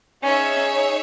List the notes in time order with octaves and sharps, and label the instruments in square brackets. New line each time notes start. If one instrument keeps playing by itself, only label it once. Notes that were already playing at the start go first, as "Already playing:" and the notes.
[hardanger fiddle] C#4 [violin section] D#4 G#4 C#5 E5